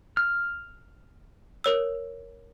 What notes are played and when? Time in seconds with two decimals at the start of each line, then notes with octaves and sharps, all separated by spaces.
0.17 F6
1.64 A#4 C#5 E6